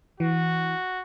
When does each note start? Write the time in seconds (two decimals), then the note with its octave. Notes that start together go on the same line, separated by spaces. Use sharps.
0.20 E3 F#4